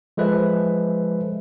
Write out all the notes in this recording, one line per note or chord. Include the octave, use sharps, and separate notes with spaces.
F3 G#3 A4 B4 C5 E5